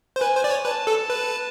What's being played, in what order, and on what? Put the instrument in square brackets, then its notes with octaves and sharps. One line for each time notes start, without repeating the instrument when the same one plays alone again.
[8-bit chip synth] C5
[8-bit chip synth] B4 [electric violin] G#5
[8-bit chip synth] C5
D5
C#5
[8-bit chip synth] B4 [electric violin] A5
[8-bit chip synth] A4
B4